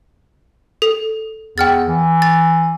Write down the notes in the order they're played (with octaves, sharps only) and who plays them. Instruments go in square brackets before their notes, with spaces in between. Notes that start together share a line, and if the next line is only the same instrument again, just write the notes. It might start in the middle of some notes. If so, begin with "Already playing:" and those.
[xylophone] A4
[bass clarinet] E2 [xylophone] G5 F6 A6
[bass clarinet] E3
[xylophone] A6